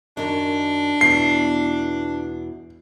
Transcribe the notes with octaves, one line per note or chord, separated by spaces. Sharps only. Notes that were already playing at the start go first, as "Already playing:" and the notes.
F#2 D#3 D4
E2 B2 C7